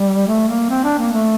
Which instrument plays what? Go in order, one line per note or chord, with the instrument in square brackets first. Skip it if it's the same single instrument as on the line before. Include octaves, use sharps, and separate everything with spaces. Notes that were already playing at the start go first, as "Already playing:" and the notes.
Already playing: [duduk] G3
A3
A#3
C4
D4
A#3
A3